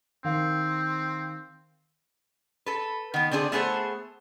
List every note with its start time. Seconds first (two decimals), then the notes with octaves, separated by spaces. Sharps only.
0.24 D#3 C4 F5
2.66 A4 B4
3.14 D#3 B3
3.31 D3 C4 D4 G#4
3.52 A3 B3 G#4 A4 C5